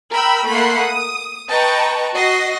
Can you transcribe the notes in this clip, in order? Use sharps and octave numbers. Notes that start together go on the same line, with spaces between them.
A#4 G5 B5 E6
A3 A#3 F#5 B5 C6 C7
D#6
B4 D#5 G5 A5 A#5 C#6
F#4 D#5 A#6 C7